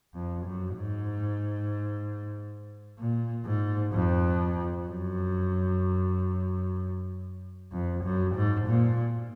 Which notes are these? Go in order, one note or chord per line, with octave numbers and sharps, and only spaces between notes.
F2
F#2
G#2
A#2
G#2
F2
F#2
F2
F#2
G#2
A#2